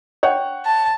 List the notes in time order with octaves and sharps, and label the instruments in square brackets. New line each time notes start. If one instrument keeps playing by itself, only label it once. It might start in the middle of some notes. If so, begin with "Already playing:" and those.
[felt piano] C#5 F#5 G5
[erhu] A5